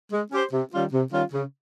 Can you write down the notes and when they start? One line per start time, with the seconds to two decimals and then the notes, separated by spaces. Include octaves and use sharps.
0.12 G#3
0.31 C#4 G4 C5
0.52 C3
0.73 D#3 G3 C#4 F4
0.93 C3
1.12 D#3 G3 C#4 F4
1.32 C#3